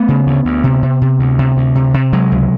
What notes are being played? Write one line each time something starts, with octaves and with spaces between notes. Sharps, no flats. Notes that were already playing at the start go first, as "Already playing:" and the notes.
Already playing: A3 B3
C#3
D2
D2
C3
C3
C3
D2
C3
D2
C3
C3
C3 F#3 G#3
C#2